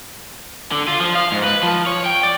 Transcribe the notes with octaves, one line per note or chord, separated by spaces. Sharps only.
D3
F4
F3
F5
G#2
B4
F3
C#5
G5
D5